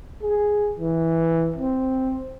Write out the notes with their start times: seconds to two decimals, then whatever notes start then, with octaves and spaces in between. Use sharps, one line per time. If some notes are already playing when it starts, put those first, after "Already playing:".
0.22 G#4
0.79 E3
1.56 C4